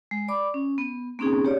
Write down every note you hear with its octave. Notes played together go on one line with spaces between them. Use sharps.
G#3
D5 B5 D6
C#4
B3
A#3 C4 C#4 D#4 G#4
G4 C#5 D5